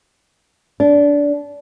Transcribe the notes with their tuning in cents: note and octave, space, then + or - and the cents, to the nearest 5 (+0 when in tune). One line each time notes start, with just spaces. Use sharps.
D4 -20